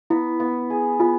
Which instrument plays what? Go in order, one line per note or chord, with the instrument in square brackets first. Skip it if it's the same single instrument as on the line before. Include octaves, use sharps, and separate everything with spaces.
[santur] B3 [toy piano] E4
[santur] B3
G#4
[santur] B3 [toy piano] F4